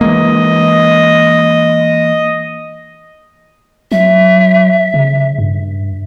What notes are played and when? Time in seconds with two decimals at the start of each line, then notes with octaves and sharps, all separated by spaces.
0.01 E3 G#3 A#3 D#5
3.92 F#3 E5
4.94 C#3
5.39 G2